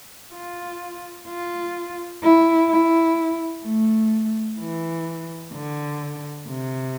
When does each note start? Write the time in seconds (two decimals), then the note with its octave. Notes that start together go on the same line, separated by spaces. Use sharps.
0.33 F4
1.28 F4
2.23 E4
2.69 E4
3.64 A3
4.59 E3
5.54 D3
6.48 C3